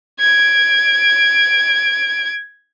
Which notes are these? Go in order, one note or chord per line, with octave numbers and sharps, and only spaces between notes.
G#6 D7